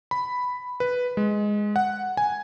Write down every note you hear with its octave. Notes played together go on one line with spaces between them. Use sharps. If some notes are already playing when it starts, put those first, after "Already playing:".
B5
B4
G#3
F#5
G#5